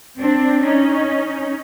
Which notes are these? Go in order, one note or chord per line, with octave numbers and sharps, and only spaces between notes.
C4 D4
C#4 D#4